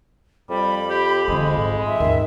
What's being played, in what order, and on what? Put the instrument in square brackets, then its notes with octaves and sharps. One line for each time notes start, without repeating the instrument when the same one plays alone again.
[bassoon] F2 [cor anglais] G3 [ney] B5
[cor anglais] G4
[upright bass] D3 A3 [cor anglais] G#3
[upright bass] G#2 C4
[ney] E5
[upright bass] D#2 G#2 [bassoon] D#3